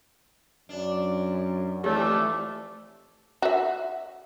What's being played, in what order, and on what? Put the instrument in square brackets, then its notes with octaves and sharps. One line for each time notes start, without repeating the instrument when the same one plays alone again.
[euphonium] F#2 [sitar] D4
[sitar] F2 A#2 [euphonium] E3 [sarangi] A3 [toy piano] G4 C#5
[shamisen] F#4 E5